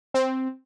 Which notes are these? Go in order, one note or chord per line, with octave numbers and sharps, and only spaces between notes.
C4